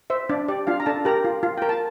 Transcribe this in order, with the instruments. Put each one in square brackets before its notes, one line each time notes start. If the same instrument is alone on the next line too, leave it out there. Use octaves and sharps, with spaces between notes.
[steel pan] C5 E5
D4 D5
G4 D5
D4 F4 F5
A#5
D4 A4 A5
G4 A#4 A#5
F4
F4
A#4 G5
A5